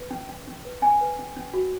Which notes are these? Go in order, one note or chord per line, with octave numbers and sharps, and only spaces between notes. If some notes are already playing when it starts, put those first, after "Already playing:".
Already playing: B4
C#4
C#4
C#4
B4
C#4 G#5
B4
C#4
C#4
F#4